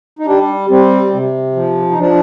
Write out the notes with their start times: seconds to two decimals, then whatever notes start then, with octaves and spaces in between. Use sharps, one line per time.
0.19 D#4
0.26 G3 D4
0.70 G3 C4
1.13 C3
1.55 F3
1.92 D#4
1.98 F3 D4